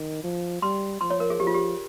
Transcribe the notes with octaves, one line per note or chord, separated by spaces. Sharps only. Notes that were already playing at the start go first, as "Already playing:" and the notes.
Already playing: D#3
F3
G3 C6
F3 C6
C#5
A#4
G#4
F3 G4
F4
G4